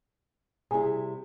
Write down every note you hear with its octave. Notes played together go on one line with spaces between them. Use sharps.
C3 G3 E4 G#4